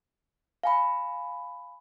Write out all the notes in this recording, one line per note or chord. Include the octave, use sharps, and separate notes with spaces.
F5 G#5 B5